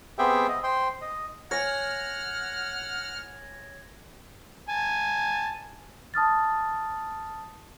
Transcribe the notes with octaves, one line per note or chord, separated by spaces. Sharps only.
B3 C4 G4 G#4 E5 G5
D#5
C5 G5 C6
D#5
C#5 F#5 G#5 F6 G#6 A#6
G#5 A5
A5 D#6 F6 A6